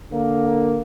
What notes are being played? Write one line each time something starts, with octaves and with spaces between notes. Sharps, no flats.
D3 A#3